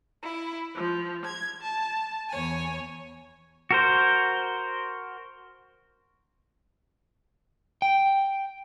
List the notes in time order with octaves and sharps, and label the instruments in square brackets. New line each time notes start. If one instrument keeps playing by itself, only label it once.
[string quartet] E4
F3
G#6
A5
E2 C#5 G#5
[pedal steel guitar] F#4 A#4 C5
[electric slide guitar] G5